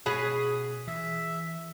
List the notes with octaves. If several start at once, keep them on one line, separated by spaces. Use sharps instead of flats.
B2 C#4 F#4 G#4 B4 D#6
E3 E5